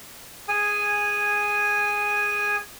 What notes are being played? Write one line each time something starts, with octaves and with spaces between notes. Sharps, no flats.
G#4 G#5